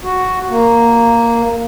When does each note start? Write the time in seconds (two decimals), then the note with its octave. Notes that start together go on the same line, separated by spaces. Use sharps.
0.03 F#4
0.49 A#3